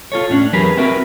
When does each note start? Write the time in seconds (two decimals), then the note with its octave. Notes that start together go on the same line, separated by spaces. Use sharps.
0.12 F4 A4 C#5
0.30 A2 C#4 D4
0.53 E2 F#3 G4 G#4 A#4 B4
0.77 C4 E4 F#4 A#4 B4